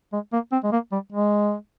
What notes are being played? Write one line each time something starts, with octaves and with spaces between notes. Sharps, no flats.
G#3
A#3
C4
G#3
A#3
G3
G#3